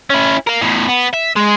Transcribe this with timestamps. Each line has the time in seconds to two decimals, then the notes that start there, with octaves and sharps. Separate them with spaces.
0.10 C#4 E4
0.47 A#4 F5
0.61 E2 A2
0.88 B3
1.13 E5
1.36 G#3